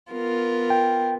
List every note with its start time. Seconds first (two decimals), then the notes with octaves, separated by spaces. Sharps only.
0.11 B3 F4 A#4
0.70 G5